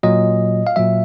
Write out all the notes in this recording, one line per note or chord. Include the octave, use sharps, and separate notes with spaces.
A#2 F#3 D#5
F5
A#2 F#3 E5